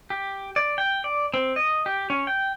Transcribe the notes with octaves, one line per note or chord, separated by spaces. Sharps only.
G4
D5
G5
D5
C4
D#5
G4
C#4
G5